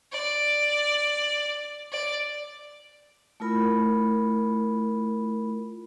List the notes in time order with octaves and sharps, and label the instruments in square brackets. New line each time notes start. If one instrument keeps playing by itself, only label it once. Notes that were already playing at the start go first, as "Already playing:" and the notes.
[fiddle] D5
D5
[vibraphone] A3 E4 F4 A#4 B5